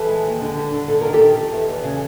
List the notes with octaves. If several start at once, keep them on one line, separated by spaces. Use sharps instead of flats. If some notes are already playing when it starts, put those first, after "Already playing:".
Already playing: E3 G4 A4
G#3
D#2
D3
G3
D3
G#2 A4
D#3 A#4
G4 A4
D#3
D#3
E2
E2
C#3